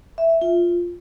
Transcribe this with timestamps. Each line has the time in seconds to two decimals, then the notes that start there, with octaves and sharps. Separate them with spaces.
0.18 E5
0.30 E5
0.42 F4